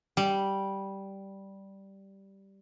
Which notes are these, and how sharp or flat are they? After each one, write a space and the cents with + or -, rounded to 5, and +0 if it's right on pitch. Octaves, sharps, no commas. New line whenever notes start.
G3 -5